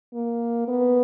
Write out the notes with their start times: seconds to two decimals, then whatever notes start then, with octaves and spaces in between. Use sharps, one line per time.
0.14 A#3
0.68 B3